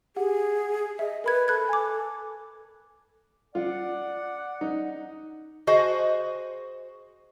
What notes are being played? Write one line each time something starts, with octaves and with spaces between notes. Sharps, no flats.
G4 G#4 F#5
D#5 E5
A#4 B4 B5 G#6
A4 B5 F#6 G#6
G#5 D6
F4 D5 F#5
D#4
F#4 G#4 C5 D#5